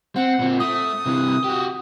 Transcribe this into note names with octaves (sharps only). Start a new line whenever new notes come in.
C4 F#5
A#2 C4
A3 D#6
C3 E3
F#4 G4